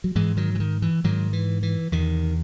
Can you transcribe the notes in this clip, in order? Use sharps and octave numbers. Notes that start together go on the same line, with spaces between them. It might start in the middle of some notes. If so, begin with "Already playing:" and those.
F#3
G#2 E3 G#3
D#3 F#3
E3
D#3
E3
G#2 D#3 F#3
E3
E3
E2 C3 D#3